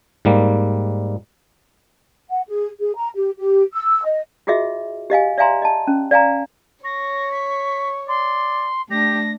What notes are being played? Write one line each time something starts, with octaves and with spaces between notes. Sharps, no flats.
G#2 G3 A#3
F#5
G#4
G#4
A#5
G4
G4
E6
D#5
F4 F#4 G#4 D#5 E5
G4 D#5 F5 G#5
D5 E5 F5 G#5 A#5 C6
D#5 A5
C#4
D5 F5 G#5 A#5
C#5 C#6 A#6
B6
D5 C6
A3 D4 G4 A#6